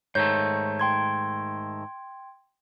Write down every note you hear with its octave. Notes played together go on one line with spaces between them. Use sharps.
G#2 D#3 A3 C#5 G6
G5 C6 G#6